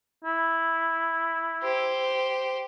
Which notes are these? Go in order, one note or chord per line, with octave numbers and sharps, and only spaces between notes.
E4
G4 C5